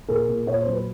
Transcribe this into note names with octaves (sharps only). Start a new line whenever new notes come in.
A#2 G#4 A#4
A#2
A#2 C#5
C5
F#3
B4